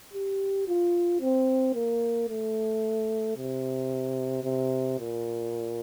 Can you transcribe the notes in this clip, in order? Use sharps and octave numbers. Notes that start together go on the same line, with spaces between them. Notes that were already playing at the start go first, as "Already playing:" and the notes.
G4
F4
C4
A#3
A3
C3
C3
A#2